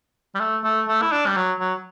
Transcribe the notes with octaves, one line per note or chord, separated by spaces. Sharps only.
G3
A3
A3
A3
E4
D4
G3
F#3
F#3